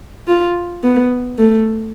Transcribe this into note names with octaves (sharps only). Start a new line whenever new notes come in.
F4
B3
A3